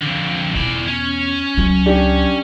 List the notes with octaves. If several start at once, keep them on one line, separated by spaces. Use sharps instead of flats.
F2 D3
E2 B2 E3 D5
C#4
C#2 F#3
D4 G4